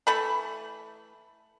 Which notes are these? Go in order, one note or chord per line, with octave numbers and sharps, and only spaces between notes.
E3 A3 B5